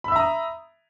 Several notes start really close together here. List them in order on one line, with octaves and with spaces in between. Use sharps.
B5 E6 E5 A#5 D#6